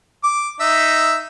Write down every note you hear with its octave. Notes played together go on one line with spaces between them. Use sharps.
D6
D#4 E5